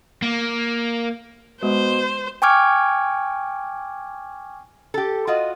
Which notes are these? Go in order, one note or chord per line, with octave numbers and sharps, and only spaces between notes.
A#3
B2 G#3 C5
G5 G#5 C#6 D6 F6 G#6
G4 A4
F4 F#4 D#5